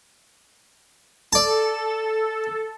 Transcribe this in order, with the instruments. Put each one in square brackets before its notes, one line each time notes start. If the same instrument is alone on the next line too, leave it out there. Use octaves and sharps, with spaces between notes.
[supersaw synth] A4 [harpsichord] D5 A5